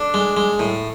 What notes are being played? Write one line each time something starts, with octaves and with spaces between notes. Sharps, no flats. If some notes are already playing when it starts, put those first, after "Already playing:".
Already playing: D4 A4
G#3
G#3
A2